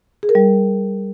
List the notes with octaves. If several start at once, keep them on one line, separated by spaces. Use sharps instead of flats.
G#4
A#4
G3